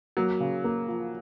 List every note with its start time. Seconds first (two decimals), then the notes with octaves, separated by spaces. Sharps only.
0.17 F#3 A#3
0.40 C#3
0.64 A#3
0.88 F3